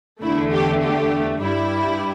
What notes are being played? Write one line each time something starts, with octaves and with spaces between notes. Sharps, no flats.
E2 D3 A3 E4
G4
G4
G2 G3 E4